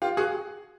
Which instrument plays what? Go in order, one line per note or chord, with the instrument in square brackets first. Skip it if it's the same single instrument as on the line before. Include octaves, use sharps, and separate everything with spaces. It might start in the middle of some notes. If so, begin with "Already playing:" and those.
[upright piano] F4 G4
F#4 G#4